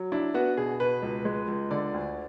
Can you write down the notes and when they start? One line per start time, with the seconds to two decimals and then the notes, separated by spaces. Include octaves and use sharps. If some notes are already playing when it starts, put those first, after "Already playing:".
Already playing: F#3
0.12 D4 E4
0.34 B3 F#4
0.57 B2 G#4
0.80 B2 B4
1.03 C#2
1.25 G#3
1.48 C#2
1.71 D3 D5
1.94 D2